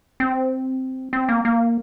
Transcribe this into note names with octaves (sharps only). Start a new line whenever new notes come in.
C4
C4
A#3
A#3